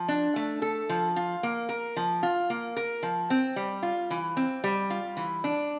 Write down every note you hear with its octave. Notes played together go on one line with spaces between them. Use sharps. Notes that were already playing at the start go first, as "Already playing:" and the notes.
Already playing: F3
D4
A3
A4
F3
F4
A#3
A#4
F3
F4
A#3
A#4
F3
C4
G3
F4
E3
C4
G3
F4
E3
D4